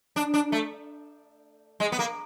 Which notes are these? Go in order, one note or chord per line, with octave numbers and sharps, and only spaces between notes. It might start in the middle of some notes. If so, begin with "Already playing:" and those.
D4
D4
A3
G#3
B3
A#3